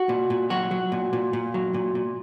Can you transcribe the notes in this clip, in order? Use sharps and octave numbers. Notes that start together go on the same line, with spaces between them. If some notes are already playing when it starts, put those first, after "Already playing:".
Already playing: F#4
A#2
A#2
F#3 F#4
F#3
A#2
A#2
A#2
F#3
A#2
A#2